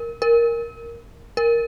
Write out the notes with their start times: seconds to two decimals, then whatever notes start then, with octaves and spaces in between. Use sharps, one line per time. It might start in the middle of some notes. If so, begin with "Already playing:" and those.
Already playing: A#4
0.22 A#4
1.37 A#4